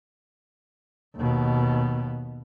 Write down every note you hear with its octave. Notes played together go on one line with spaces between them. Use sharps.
D#2 B2